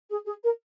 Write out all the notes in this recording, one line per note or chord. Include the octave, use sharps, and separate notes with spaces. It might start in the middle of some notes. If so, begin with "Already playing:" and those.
G#4
G#4
A#4